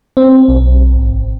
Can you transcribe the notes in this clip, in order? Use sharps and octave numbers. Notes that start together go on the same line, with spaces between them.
C4
B1
G#1